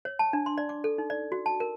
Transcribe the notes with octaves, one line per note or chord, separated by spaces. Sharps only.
C#5
A5
D4
C6
D5
D6
A4
D#4
D5
F#4
A5
A#4